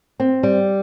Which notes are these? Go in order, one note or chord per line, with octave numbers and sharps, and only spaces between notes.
C4
G3